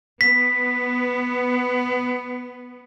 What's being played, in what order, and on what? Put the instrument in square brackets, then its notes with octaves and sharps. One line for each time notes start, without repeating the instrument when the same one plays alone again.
[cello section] B3 [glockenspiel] B6